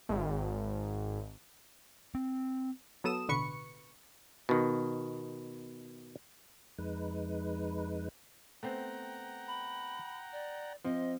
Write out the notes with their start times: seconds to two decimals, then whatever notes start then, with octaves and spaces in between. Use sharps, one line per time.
0.09 G#1
2.15 C4
3.04 F#3 B3 A4 D#6 E7
3.28 A1 B2 D3 B4 C#6 C#7
4.49 B2 D#3
6.78 F2 G#3 D#4 B4
8.63 A3 B3 C4 F#5 G5 A#5
9.48 B5
10.32 D5
10.85 F3 C4 D#5